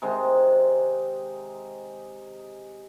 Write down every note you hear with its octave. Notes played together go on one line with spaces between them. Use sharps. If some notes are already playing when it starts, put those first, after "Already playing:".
C3 D#3 G#3 D#4